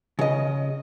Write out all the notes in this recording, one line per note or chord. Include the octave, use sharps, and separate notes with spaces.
C#3 D#5